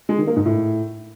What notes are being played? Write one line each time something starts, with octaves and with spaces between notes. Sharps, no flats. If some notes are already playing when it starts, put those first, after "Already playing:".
G#3
D#3
A#3
G#2
A2